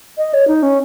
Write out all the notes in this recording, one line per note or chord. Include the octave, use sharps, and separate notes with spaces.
D#5
C#5
D#4
C#4